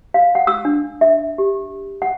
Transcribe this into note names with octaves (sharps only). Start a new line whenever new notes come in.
F5
F#5
E6
D4
E5
G4
F#5